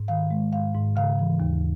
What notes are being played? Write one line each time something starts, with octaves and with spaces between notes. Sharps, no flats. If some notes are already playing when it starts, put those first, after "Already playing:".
Already playing: G#2
D#3 F5
G#3
G#2 F5
G#2
C#3 F5
E3
D#2